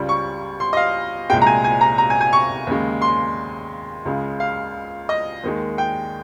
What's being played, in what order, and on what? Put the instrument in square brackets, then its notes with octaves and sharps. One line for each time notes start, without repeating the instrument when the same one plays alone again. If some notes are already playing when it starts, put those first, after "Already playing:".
Already playing: [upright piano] C#2 C#3 G3
C#6
C6
D#5
F5
C2 A#2 G#3 G5
A#5
G#5
G#5
A#5
A#5
G#5
G#5
C#6
D#2 C#3 G#3
C6
C#2 C#3 G#3
F5
D#5
D#2 D#3 G#3
G5